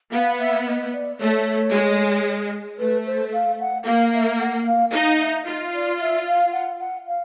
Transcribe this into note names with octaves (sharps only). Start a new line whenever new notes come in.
B3 F5
E5
D#5
D5
A3 C#5
G#3
A3 B4
C5
F5
F#5
A#3 F5
E5
F#5
F5
D#4 F5
E5
F4 D#5
D5
E5
F5
F#5
F#5
F5